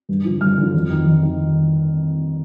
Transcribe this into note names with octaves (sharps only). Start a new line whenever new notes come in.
G2
D3 F3
G2 F6
D3 F3
F2
D#3
F2
D#3